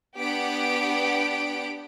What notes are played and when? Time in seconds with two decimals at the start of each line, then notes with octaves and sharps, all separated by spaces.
0.17 B3 D4 G4 F#5 B6 D7